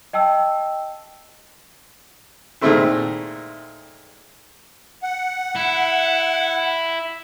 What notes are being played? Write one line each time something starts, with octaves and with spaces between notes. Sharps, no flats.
D#5 G5 A5 E6
A#2 D#3 G#3 A3 C4 E4
F#5
E4